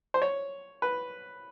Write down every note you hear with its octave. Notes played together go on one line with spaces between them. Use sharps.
C5
C#5
B4